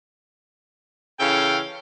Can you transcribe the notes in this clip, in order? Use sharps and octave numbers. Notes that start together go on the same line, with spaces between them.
C#3 E3 C#4 A4 F5 G5